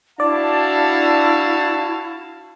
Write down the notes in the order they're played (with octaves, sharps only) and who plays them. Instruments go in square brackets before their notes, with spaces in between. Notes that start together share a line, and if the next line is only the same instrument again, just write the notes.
[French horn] D4 [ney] E4 [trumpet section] F#4 F5 A5 [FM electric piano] D5